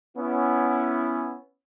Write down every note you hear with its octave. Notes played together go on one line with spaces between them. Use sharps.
B3 C#4 E4